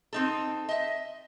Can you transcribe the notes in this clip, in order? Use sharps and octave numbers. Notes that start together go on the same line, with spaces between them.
C4 D#4 A4
D#5 E5